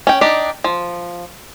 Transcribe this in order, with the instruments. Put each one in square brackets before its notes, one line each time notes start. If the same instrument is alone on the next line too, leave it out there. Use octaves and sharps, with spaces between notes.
[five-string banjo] C#4 G5
D4 D#4 G4
F3